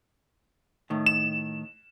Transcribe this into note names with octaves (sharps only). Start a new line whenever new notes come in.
A2 D#3
E7